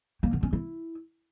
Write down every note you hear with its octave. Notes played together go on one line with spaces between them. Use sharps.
A#3
D3
C#4
E4